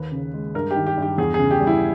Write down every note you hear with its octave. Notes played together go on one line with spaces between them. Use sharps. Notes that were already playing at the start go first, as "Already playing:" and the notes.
Already playing: D#2 A#3 B4
C#3
G#3
G2 A#4
D#3 G4
G4
G2 G4
E2 G#4
G#4
C#3
G4
G3
E4